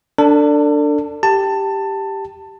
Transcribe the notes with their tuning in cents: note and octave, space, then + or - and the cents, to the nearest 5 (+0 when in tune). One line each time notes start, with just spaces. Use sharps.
D4 +0 A4 +35
G4 +0 A5 +15